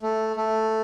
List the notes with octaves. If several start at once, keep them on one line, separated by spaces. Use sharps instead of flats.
A3
A3